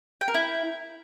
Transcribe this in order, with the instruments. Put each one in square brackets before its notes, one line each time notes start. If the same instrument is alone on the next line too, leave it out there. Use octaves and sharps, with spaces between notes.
[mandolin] G5
A#4
E4